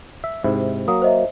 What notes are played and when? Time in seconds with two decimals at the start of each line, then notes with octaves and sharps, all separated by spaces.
0.24 E5
0.44 G#2 C3 E4
0.88 F#3 A#3 D#6
1.02 C5 D#5 E5